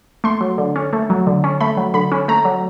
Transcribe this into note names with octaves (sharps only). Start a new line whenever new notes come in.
A3 C6
F#3
D3
C#4
A3
F#3
D3
C#4
A3 B5
F#3
D3 B5
C#4
A3 A#5
F#3